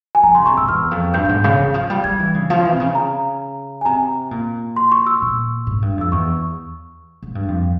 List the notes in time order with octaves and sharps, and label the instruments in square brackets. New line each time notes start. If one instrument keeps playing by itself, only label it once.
[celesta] G#5
[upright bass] F3 [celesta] A#5
[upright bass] C#3 [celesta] C6
[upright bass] C3 [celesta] C#6
[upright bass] G#2 [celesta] E6
[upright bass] E2 [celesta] F6
[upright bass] F2
[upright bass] G2 [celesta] G6
[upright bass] G2
G#2
C#3
E3
F3
G3
[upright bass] G3 [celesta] G#6
[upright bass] E3
C#3
F3
E3
C3
C#3
[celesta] A#5
G#5
[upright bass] C3 [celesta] A#5
[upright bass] A#2
[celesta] C6
C#6
E6
[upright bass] A#2
G#2
G2
[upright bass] F2 [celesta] E6
[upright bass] E2 [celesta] C#6
[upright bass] G#2
G2
F2